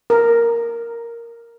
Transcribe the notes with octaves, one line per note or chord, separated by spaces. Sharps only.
A#4